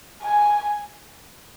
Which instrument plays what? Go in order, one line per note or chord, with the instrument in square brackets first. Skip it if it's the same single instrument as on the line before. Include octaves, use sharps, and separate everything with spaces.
[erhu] G#5